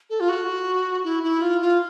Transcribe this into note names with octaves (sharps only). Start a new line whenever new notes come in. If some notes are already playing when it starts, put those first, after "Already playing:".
A4
F4
F#4
E4
E4
F4
F4